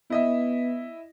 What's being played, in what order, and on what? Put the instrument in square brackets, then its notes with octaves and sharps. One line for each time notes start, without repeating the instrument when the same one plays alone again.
[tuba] B3 [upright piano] E4 D#5 E5